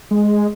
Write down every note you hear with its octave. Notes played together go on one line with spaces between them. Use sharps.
G#3